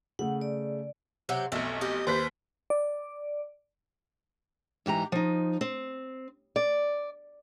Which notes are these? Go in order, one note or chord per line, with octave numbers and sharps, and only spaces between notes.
C#3 A3 F#5
D5
C3 F#3 G4
F1 B1 A3
G4 D#5
D#2 B4 C5 B6
D5
G#2 E3 G4 A#5
F3 D#4
C4
D5